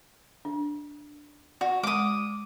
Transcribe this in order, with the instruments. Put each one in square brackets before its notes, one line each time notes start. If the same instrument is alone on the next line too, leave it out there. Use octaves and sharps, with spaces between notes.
[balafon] D4
[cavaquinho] F#4 [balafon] D5
[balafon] G#3 [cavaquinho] D6 D#6